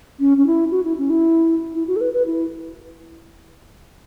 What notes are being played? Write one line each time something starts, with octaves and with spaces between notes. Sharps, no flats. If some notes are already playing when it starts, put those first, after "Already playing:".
C#4
C#4
E4
F#4
E4
C#4
E4
E4
F#4
A4
B4
B4
E4